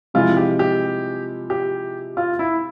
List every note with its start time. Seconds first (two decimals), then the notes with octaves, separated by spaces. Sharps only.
0.14 C3 F3 G#3 E4 F4
0.37 G4
0.59 G4
1.50 G4
2.17 F4
2.39 E4